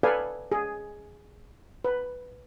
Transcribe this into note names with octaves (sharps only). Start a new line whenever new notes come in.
A4 B4 D5 F5 G#5
G#4
B4